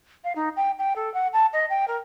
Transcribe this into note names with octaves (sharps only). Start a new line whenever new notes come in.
F5
D#4
G5
G5
A4
F#5
A5
D#5
G5
A#4